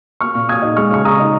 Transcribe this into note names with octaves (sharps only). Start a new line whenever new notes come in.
A#3 C#6 F6
A#2
A#2 D#6 G#6
D#4
G#3 C#6 F6
C#3 C#6
C#3 A#5 D#6
D#4